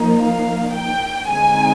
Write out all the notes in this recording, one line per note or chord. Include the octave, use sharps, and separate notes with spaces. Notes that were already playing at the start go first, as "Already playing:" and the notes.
Already playing: F3 A#3 D#4
F5
G5
D3 G#3 C4 D#4 G#5